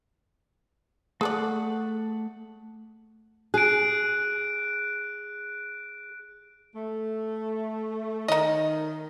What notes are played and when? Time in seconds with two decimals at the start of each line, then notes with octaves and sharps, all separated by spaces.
1.21 A3 G#4 A4 D5 F#5
3.54 G#4 F#6 D7
6.75 A3
8.28 D#3 D#4 D#5